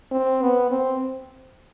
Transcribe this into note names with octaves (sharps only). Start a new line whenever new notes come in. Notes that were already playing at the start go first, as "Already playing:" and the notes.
C4
B3
C4